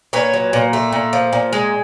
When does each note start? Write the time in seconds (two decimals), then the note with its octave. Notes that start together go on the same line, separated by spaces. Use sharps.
0.13 A#2 B4 C#5
0.34 F#3
0.53 A#2
0.73 A3
0.93 A#2
1.13 F3
1.33 A#2
1.53 G#3